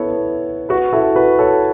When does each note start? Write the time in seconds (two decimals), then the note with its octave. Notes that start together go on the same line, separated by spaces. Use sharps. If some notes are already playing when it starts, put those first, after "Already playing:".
Already playing: B3 E4 A4 C#5
0.69 F#4 B4
0.93 E4 A4
1.16 F#4 B4
1.39 A4 C#5